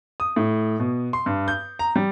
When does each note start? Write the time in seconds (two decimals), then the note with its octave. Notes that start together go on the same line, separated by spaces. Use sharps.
0.20 D#6
0.36 A2
0.80 B2
1.13 C6
1.26 G2
1.48 G6
1.79 A#5
1.96 G3